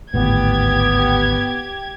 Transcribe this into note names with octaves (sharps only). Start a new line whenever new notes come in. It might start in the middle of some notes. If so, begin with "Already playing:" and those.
G#1 D2 A2 B3 G4 G#6